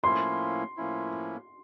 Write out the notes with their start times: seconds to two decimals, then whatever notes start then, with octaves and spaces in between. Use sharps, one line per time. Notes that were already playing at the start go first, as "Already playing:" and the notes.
0.04 A2 F3 A#3 C#4 E4 C6
0.77 A2 F3 A#3 C#4 E4